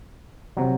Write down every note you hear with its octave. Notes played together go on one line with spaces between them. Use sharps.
C3 F#3